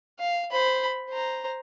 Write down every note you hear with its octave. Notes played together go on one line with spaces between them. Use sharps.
F5
C5 B5
C5 A#5